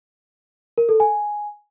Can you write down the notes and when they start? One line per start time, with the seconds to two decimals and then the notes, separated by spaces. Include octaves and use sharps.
0.78 A#4
0.89 A4
1.00 G#5